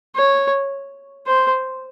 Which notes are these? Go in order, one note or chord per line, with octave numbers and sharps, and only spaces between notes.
C#5
C5